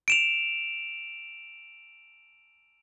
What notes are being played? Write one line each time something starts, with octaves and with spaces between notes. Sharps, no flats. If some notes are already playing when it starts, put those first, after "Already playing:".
D7 E7 F7